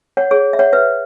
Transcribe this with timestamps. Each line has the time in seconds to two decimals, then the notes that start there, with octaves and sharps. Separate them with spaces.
0.17 C#5 F#5
0.31 G#4 C#5
0.53 E5
0.59 C#5 F#5
0.73 B4 E5